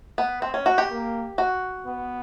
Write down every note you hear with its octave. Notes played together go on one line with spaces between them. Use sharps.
B3
C4
C#4
F#4
G4
A#3
F#4
B3